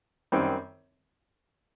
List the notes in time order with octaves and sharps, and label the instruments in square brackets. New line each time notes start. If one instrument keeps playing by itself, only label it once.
[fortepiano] F#2 D#3 G3 C4